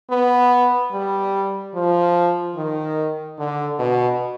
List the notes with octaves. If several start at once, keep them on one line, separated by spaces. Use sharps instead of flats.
B3
G3
F3
D#3
D3
B2